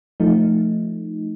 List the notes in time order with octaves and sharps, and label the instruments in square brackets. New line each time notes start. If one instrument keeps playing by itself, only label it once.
[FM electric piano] F3 A3 D#4